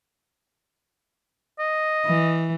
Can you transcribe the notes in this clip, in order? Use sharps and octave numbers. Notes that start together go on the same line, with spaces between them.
D#5
E3